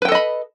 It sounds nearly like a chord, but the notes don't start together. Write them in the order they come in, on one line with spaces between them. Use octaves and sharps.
B4 G5 A4 D#5 B5